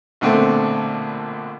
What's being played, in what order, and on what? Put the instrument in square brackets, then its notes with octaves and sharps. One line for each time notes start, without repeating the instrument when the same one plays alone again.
[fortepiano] A#1 B2 D3 A3 C4